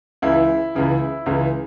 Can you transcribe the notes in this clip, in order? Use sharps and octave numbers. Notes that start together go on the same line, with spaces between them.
C#2 C#3 E3 E4
C#2 C#3 E3
C#2 C#3 E3